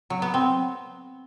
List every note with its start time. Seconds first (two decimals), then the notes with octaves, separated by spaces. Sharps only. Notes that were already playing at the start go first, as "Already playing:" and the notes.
0.10 F#3
0.22 B3
0.34 C4